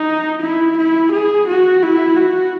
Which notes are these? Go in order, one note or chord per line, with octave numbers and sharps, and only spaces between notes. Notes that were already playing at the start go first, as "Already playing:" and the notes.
Already playing: D#4
E4
E4
G#4
F#4
E4
F#4